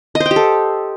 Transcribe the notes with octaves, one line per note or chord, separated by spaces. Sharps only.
D#5
C5
G5
G4
A4